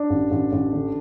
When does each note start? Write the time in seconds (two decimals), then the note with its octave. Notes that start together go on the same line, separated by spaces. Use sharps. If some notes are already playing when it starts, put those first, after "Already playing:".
Already playing: D4
0.10 A1
0.31 A1
0.52 A1
0.73 D3